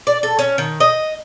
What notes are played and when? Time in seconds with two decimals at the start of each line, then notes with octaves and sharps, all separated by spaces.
0.07 D5
0.23 A4
0.39 C#4
0.58 D#3
0.80 D#5